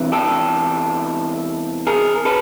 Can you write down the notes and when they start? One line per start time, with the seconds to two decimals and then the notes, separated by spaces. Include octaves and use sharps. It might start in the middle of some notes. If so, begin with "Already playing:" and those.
Already playing: E2 C3 E3
0.12 G4 A4
1.87 G#4 A#4
2.25 A4 B4